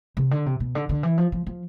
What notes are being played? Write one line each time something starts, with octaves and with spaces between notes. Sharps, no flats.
C3
D3
C3
B2
D3
D3
E3
F3
F3
F3